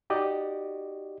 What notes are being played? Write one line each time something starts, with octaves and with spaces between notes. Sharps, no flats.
D#4 F#4 G4 D5 D#5